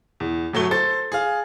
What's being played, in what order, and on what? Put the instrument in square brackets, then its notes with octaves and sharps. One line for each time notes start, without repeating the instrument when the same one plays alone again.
[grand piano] E2
G1 F#3 A3 G7
A4 C5 A6
G#4 F5